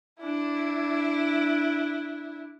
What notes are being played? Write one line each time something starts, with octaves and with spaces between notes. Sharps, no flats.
D4 E4